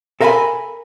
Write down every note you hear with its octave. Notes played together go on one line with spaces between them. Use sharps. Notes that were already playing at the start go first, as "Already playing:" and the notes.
A4 A#4 E5 F5 G#5 B5